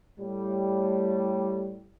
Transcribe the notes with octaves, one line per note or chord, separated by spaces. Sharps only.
A2 G3